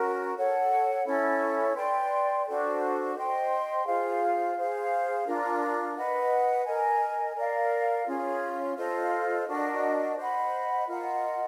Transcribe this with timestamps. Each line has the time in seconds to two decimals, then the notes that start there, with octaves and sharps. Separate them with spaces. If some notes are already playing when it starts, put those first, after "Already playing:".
Already playing: C#4 F#4 A#4
0.36 A4 C#5 F#5
1.06 C#4 E4 A4
1.76 B4 D5 G5 C6
2.46 D4 F#4 A4 C5
3.16 C5 D#5 G5 C6
3.86 F4 G#4 C5 F5
4.57 G#4 C5 F5
5.26 D4 F4 A#4
5.96 B4 D#5 F#5
6.66 A#4 D#5 G#5
7.36 A#4 D5 F5
8.07 C#4 F4 G#4
8.77 F4 A4 C5 D#5
9.47 D4 F#4 A#4 D#5
10.17 C5 D#5 F#5 B5
10.87 F4 A#4 D#5 F#5